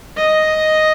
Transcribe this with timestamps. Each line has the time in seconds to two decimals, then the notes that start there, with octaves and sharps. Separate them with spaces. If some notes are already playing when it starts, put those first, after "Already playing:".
0.17 D#5